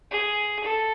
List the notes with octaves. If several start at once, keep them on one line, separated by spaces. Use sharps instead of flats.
G#4
A4